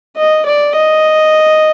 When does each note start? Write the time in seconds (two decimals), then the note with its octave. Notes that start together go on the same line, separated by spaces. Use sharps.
0.17 D#5
0.46 D5
0.76 D#5